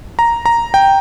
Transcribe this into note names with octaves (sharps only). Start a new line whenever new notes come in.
A#5
A#5
G5